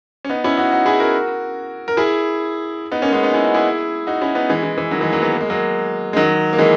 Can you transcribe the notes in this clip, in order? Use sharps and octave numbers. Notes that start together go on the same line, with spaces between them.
C#4
B3 D#4
C#4 E4
D#4 F#4
D#4 F#4
E4 G#4
F#4 A#4
A#4
E4 G#4
B3 D#4
A#3 C#4
G#3 B3
B3 D#4
C#4 E4
D#4 F#4
E4 G#4
D#4 F#4
C#4 E4
B3 D#4
E3 G#3
E3
E3
D#3 F#3
E3 G#3
F#3 A#3
G#3 B3
A#3
G#3
F#3 A#3
G#3
D#3 F#3
A#3
E3 G#3